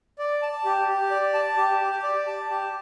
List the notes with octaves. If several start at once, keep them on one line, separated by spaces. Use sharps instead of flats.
D5
A5
G4
G4
D5
A5
G4
G4
D5
A5
G4